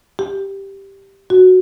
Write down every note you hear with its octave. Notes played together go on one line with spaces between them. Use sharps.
G4
F#4